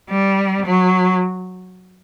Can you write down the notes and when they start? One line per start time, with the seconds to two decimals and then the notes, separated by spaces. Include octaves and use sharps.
0.10 G3
0.65 F#3